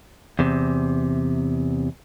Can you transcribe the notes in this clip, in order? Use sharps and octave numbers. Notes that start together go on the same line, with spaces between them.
E2 C3